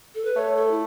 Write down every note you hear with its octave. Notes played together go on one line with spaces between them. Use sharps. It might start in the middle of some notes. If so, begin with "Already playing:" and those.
A4
B4
A3 C#5
A4
E4